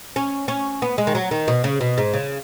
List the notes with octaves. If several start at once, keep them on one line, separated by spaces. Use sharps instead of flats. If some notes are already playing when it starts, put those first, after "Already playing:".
C#4
C#4
B3
G#3
D#3
F#3
D#3
B2
C#3
B2
G#2
C#3